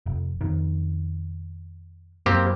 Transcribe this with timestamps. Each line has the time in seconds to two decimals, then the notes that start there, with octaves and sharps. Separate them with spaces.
0.06 F1
0.41 F2 D#3
2.26 F#2 A#3 C4 G4